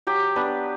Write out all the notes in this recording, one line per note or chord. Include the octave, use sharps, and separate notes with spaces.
F#3 G4
B3 D4 B4